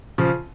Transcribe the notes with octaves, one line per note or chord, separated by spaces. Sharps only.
C#3 F3